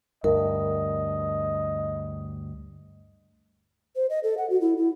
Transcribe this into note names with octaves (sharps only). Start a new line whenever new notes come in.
D2 G2 A#4 D#5
C5
D#5
A4
F#5
F#4
E4
E4